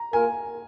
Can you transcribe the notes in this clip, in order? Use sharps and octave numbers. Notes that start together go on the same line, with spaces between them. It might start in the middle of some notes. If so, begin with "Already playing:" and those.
Already playing: A#5
A#3 F4 A#4 G#5